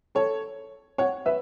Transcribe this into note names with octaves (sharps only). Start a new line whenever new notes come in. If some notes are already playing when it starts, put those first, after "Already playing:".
A4 C#5
C#5 F#5
B4 E5